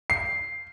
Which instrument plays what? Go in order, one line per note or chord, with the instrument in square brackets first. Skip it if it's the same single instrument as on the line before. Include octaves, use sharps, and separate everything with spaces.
[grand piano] C7